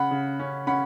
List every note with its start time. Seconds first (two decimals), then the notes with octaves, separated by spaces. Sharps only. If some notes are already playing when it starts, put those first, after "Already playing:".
Already playing: C#3 F#5 B5
0.11 C#3
0.39 C#4
0.67 C#4 F#5 B5